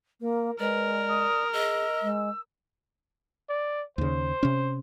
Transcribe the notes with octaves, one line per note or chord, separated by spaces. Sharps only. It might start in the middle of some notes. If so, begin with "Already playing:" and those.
A#3 A#4
G#3 A#4 B4 D5
D#6
G#4 D#5 E6
G#3
D5
D#2 C#3 C5
C3 C#4